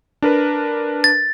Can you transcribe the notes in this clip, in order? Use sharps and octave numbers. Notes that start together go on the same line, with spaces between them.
D4 A#4 B4
A6